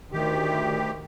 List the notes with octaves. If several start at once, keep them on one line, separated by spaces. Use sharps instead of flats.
D2 D#3 G4